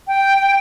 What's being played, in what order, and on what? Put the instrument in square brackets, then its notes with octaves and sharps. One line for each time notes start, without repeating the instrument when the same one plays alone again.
[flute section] G5